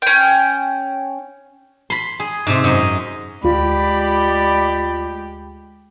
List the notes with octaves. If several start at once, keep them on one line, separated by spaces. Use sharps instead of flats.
C#4 G5
B5 C6
G#4
G#2 C3
F#2 D#5
D2 G#3 F4 G4 D5 B5